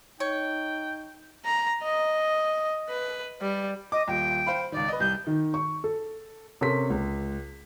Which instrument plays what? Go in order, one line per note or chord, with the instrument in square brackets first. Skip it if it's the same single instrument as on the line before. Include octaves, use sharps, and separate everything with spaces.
[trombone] D#4 [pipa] C#5 [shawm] G5
[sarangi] A#5
D#5
B4
G3
[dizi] D#5 [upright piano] D6
[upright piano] D#1 [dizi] G5
[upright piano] C5 F5 B5
[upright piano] C#2 D#3 [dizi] D5
[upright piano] B4 D#5
[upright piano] C2 [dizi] G6
[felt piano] D#3
C#6
A4
[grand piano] C3 C#4 A4 A#4 C6 B6
C#2